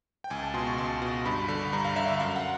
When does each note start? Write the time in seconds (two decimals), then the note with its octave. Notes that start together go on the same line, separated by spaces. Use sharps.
0.24 G5
0.30 C#2 G#5
0.43 A5
0.54 B2 C6
0.67 C#6
0.78 C#2 C6
1.02 B2
1.25 G2 B5
1.48 D3
1.73 G2 A#5
1.85 F5
1.96 D3 E5
2.08 E5
2.19 F#2 F5
2.36 F#5